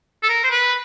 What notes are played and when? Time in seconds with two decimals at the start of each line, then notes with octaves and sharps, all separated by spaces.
0.23 A4
0.29 A#4
0.44 C5
0.51 B4